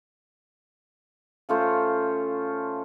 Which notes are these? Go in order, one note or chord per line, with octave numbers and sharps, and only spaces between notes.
C#3 A3 F4 C5